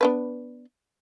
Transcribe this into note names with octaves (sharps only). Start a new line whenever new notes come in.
B3 D4 B4